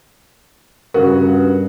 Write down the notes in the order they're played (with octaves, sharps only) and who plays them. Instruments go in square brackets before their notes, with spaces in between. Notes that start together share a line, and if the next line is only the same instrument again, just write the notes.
[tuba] G2 [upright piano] C#3 F#4 [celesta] A#4